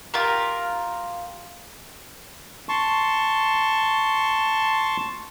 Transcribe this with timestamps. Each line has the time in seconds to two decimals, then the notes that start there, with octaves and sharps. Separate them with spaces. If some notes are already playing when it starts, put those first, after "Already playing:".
0.14 F4 G4 A#4
2.69 A5 C6 C#6